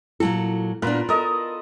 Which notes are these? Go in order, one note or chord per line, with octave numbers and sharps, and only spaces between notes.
A#2 F#3 E4 A4
A#2 B3 D4 F4 A#4 B4
A4 A#4 D#5